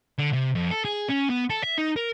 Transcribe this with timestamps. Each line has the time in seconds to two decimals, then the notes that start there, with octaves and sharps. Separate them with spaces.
0.18 D3
0.33 C3
0.55 F2
0.71 A4
0.85 G#4
1.09 C#4
1.30 B3
1.50 A4
1.64 E5
1.78 D#4
1.97 A#4